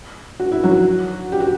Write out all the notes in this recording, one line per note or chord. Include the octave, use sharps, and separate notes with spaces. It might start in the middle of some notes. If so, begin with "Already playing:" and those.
F#4
E4
F#3 F#4
G4
F#4